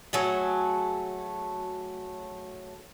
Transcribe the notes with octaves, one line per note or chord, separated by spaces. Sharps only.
F#3 A3 G#4